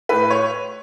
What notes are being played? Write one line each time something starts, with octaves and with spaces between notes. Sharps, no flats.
A2 B4
C#5